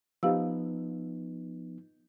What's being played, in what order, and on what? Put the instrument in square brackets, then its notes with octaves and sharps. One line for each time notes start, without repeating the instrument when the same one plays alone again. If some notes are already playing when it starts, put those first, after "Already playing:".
[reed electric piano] F3 B3 D#4 [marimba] G4 F5 E6